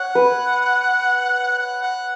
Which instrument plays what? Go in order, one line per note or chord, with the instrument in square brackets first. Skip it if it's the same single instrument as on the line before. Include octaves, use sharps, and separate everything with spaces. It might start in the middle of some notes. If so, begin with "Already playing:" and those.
Already playing: [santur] C#5 [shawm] F#5
[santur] B4
[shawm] F#5
F#5